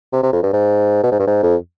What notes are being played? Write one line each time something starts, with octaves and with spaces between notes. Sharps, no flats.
C3
C3
F2
G2
G#2
B2
G#2
G2
G#2
F2